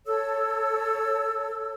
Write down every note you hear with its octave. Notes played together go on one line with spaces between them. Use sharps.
A4 C#5 E6